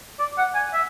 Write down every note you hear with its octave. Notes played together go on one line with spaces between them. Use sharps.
D5
F#5
G#5
E5